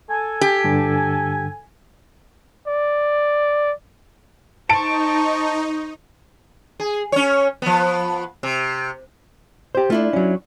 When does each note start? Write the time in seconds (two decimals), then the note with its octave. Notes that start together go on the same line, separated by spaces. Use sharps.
0.10 A4 G#5
0.41 G4
0.64 G2 D3
2.68 D5
4.69 D#4 C5 A5 C#6 D7
6.80 G#4
7.12 C#4 C#5
7.62 F3 B3
8.43 C3
9.75 G4 C5
9.90 A3 D4 E4 F4
10.13 F#3 C#4